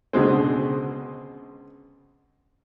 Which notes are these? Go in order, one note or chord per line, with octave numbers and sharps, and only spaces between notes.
C#2 B2 D3 G#3 C4